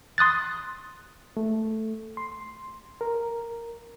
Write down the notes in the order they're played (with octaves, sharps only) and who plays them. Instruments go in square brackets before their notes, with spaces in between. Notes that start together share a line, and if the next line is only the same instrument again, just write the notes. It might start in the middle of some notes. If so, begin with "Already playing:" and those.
[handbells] C6 D#6 F#6 A6
[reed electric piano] A3
C6
A#4